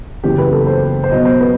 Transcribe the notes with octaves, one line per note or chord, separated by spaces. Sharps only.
F#1 F#2 E3 G4
B4
A4
C5
C5
B1 B2 F#3 D#5
C5
B4